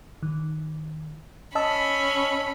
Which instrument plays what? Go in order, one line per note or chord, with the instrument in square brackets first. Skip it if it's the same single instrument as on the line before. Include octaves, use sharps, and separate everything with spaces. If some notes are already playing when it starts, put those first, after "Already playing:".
[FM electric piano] D#3
[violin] C#4 B5 [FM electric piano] D#5 A5 E6